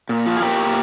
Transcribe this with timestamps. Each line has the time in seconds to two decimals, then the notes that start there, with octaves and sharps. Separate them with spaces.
0.09 A#2
0.26 F3
0.37 G#4
0.42 A#2 G4 A#4
0.58 A#2